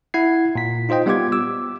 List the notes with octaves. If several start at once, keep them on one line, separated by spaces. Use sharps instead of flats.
E4 F#5 G#6 C7
A#2 B6
D#4 F4 C5 D#5 G5
G3 B3 F4 G4 D6 G#6
D6 E6